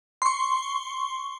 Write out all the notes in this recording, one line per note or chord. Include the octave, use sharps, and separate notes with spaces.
C6 C#6